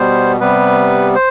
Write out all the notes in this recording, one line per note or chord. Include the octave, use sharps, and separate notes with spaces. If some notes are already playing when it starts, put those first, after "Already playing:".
Already playing: B2 G3 B3 C5
C3 G3 B3 B4
C5